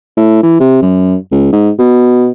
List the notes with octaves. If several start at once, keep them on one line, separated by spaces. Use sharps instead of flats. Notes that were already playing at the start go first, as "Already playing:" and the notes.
A2
E3
C3
F#2
C#2
G#2
B2